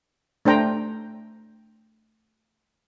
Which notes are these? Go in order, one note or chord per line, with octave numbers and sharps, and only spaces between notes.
A3 D4 C5 G5 A#5